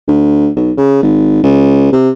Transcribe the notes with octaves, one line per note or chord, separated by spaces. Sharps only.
D2
B1
C#3
G#1
C#2
C3